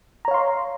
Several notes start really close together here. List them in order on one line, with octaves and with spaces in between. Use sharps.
A#5 C#5 F5 C6